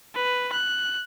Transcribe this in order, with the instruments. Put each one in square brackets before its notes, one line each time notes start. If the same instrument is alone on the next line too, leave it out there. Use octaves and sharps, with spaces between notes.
[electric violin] B4
F#6